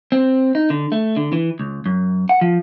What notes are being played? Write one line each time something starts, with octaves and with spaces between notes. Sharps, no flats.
C4
D#4
D3
A3
D3
E3
C#2
F#2
F#5
F3